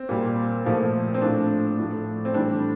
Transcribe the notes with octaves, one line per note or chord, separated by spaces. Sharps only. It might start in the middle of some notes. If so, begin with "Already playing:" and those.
Already playing: C4
A#2 G3
A#2 F3 A3
C4
A2 F3 A3 D4
A2 F3 A3
C4
A2 E3 G3 D4